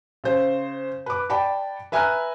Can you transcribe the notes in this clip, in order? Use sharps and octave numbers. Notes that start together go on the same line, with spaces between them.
C#3 C5
B4 D6
D5 G5 A5 B5
B4 E5 G#5 A#5 F6 F#6